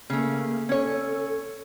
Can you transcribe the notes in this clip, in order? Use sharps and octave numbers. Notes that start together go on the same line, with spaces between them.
C#3 A3 A#3
C#4 A4 C#5